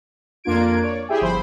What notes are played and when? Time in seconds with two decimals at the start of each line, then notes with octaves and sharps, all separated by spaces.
0.44 F2 A#3 D4 F4 G#6 D7
0.82 C#5 D5
1.08 E4 G4 G#4 E5 G5 G#5
1.21 G1 F3 C5 B5